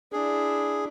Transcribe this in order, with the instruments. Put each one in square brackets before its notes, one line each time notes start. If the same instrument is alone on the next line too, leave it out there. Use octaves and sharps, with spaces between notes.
[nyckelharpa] D4 E4 [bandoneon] G#4